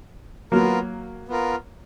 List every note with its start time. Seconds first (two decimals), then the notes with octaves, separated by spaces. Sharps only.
0.52 F#3 A#3 B3 F4 A#4
1.29 B3 F4 A#4